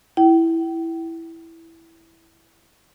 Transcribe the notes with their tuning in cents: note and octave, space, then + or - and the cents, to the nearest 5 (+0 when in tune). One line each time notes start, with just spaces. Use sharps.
E4 +0 G5 -35